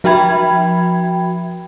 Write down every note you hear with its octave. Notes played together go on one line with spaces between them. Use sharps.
F3 F#4 E5 G5 B5 G#6